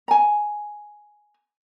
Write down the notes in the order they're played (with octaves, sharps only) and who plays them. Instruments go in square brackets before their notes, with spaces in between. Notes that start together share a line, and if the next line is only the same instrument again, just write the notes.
[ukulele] G#5 A#5